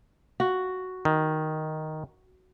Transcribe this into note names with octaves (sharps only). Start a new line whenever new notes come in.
F#4
D#3